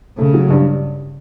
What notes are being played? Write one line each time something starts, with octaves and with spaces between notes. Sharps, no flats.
C#3 A3
F#3
G2